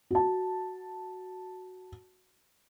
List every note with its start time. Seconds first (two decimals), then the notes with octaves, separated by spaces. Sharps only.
0.11 F#4 A5